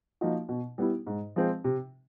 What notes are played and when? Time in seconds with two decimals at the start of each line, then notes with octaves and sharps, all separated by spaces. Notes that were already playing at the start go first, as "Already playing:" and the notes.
0.21 F3 A#3 D#4 F#4
0.49 B2
0.78 G3 B3 E4
1.07 G#2
1.36 F3 G#3 C4
1.64 C3